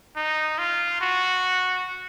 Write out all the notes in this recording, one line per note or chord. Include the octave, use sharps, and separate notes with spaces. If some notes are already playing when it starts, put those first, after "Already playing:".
D#4
F4
F#4